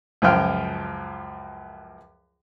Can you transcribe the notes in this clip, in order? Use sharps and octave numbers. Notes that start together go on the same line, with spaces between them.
C#2 F#2 F3 F4 G5 F6